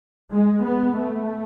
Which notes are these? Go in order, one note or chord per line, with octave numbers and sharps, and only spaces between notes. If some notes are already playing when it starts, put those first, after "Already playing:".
G#3
B3
A3